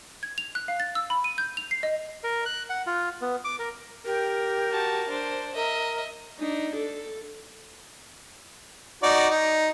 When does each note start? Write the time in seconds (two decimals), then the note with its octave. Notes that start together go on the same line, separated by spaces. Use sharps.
0.23 G#6
0.38 F7
0.55 F#6
0.68 F5
0.80 A6
0.95 E6
1.10 B5
1.24 D#7
1.38 G6
1.57 F7
1.71 C7
1.83 D#5
2.24 A#4
2.46 F#6
2.70 F#5
2.87 F4
3.21 B3
3.45 D6
3.59 A#4
4.06 G4 A#4
4.71 F#4 A5
5.08 D4 C5
5.55 A#4 D#5 E5
6.39 D4 D#4
6.76 A4
9.03 D#4 F#4 D5
9.30 D#4